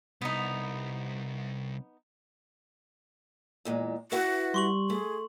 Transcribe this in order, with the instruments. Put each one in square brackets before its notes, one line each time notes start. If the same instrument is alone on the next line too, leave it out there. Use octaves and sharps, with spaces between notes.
[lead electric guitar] C2 [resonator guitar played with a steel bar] B3 D#4
[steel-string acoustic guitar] E2 A#2 G#3
[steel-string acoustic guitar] E4 B4 F#5 [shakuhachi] F#4
[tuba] G3 [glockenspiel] C6 C#6 F#7
[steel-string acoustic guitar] A3 [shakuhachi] G#4